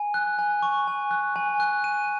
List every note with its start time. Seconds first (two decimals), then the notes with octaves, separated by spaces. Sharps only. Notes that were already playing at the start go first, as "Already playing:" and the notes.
Already playing: G#5
0.14 F#6
0.39 G#5
0.63 C#6
0.88 G#5
1.11 F#6
1.36 G#5
1.60 F#6
1.84 D#7